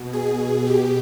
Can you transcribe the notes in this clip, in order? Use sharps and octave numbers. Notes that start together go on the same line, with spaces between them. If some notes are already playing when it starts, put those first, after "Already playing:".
Already playing: B2
G#4
B2 G4